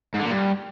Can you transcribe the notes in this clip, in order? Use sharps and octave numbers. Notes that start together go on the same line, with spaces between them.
G#2
D3
A#2
G2